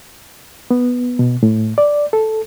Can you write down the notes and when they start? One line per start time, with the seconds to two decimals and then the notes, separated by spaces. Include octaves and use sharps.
0.71 B3
1.19 B2
1.43 A2
1.78 D5
2.13 A4